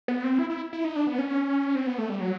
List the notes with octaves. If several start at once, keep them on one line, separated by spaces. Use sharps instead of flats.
B3
C4
E4
E4
E4
D#4
D4
B3
C#4
C4
B3
A3
G3
F#3